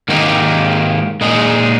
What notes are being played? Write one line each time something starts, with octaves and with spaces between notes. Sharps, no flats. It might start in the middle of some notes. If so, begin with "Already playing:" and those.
G#2 D#3 A#3 D#4 G4
A#2 G#3 D#4 G#4